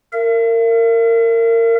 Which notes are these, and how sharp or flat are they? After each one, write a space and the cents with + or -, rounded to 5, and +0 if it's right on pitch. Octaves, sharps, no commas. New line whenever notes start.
A#4 -25 E5 +40